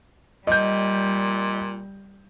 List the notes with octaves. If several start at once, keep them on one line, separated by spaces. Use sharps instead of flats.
A#2 G3 D#5 G6